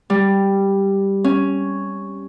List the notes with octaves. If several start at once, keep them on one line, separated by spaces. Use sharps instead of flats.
G3
C#4